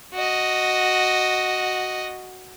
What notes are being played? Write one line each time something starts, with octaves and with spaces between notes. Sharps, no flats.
F#4 D#5